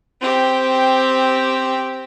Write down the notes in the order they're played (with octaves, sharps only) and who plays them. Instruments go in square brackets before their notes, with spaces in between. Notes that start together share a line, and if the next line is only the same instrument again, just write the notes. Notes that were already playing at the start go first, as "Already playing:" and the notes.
[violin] C4 G4